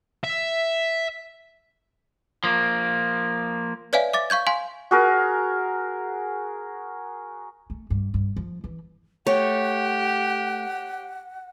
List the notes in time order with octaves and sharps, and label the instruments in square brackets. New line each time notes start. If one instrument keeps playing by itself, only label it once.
[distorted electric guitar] E5
[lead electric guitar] F3 A#3
[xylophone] B4 C#5 D5 E5 F5 G#5
E5 D6 A6
F5 C#6 G6 G#6
F5 G#5 C6
[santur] F#4 G#4 A#4
[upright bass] A3
G2
G2
F3
E3
[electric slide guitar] A3 [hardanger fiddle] G4 [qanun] C#5 [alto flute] F#5